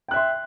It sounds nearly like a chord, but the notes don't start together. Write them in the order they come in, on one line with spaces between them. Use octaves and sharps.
G5 F#6 E5 C6